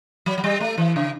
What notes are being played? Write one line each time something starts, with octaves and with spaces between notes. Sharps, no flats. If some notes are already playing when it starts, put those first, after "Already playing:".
F#3
F#3
G3
A3
E3
C#3